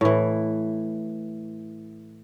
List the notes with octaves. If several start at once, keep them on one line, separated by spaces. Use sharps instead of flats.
A2 E3